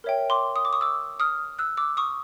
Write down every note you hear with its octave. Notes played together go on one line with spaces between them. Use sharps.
A#4 C#5 E5 G5
C6 D6
D#6
D6
C#6 D#6
D6 E6
D#6 F6
E6 F#6
D6 E6
C#6 D#6